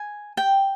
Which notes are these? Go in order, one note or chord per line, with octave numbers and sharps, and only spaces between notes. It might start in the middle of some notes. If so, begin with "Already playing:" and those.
Already playing: G#5
G5